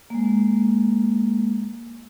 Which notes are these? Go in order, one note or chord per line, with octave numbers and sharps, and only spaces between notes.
G#3 A#3